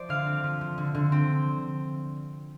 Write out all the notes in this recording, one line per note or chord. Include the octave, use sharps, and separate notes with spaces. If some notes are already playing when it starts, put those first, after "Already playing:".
Already playing: F3 C5 D5
D3 F5
C4
F3
F3
D3
D3
C4